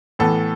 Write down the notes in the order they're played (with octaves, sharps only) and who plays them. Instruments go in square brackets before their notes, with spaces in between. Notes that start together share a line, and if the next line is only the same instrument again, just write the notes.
[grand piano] A2 E3 B3 A4